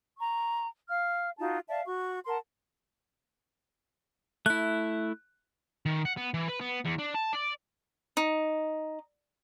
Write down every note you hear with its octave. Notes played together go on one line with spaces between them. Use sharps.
A#5 C#6
F5 F6
D#4 F4 F#4 A5
D5 E5 F5 A5
F#4 C#6
A#4 F#5 A5 C6
A3 E4 F#6
D#3
F#5
B3
E3
B4
B3
E2
D4
A5
D5
D#4